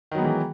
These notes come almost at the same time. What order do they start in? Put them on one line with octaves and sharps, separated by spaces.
D#3 F#3 B3 G#3 E3